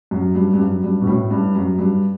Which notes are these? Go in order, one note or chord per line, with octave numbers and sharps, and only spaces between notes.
F#2
G2
G2
F#2
G2
B2
A2
G2
F#2
G2